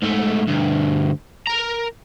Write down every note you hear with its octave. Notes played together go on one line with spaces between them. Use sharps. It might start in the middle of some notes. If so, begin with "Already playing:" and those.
G#2 A3
D2 G2
A#4 A#5